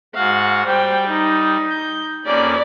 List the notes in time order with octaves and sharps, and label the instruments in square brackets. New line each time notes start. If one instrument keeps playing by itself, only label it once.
[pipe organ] G#2 F#4 F#5 [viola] F5
[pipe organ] G3 [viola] C5 G5
[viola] D#4
[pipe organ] G6
[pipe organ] F2 A#3 C#4 [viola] D5 B5